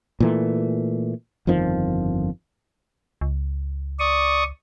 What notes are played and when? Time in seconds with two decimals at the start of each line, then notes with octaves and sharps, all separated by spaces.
0.20 A#2 E3 A3
1.47 G1 F2 D#3 F3
3.21 C#2
3.99 D5 C#6 D#6